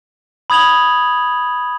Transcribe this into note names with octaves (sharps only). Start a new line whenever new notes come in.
B5 D#6 G#6 F7 F#7